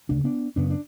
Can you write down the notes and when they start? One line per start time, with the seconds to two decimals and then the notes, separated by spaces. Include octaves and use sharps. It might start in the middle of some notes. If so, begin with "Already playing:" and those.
0.09 D2 C#3 D4
0.24 B3 D4
0.56 F#2 C#3 B3 D4
0.70 D4